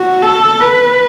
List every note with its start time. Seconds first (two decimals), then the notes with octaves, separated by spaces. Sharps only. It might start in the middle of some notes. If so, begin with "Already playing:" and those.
Already playing: F#4
0.22 A4
0.61 B4